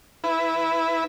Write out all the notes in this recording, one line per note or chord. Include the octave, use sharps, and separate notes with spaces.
E4 B4